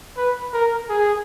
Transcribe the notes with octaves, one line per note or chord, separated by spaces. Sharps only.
B4
A#4
G#4